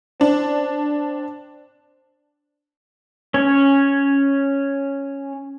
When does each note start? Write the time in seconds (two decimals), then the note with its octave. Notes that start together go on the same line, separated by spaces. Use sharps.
0.20 C4 D4
3.34 C#4 C#5